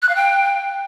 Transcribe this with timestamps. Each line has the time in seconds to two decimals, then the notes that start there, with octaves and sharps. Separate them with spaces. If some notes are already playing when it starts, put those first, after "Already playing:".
0.02 F#6
0.09 F5
0.16 G5